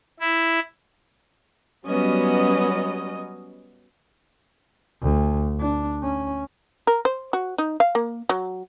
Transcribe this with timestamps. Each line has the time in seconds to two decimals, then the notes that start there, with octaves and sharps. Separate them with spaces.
0.20 E4
1.86 F#3 G3 B3 C#4 D#5
5.01 D2
5.60 D4
6.03 C#4
6.87 A#4
7.05 C5
7.33 F#4
7.58 D#4
7.80 F5
7.95 A#3
8.29 F#3